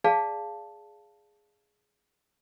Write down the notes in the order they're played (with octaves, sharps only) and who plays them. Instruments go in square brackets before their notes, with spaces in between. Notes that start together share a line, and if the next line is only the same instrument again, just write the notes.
[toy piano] G#4 D5 F5 A5